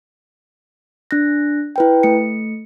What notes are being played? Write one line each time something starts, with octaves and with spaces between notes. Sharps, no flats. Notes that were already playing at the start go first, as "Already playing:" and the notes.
D4 F#6 A#6
E4 B4 G5
A3 C#7